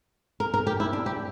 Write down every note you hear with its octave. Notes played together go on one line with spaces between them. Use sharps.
A#4
A#4
G4
E4
D4
G4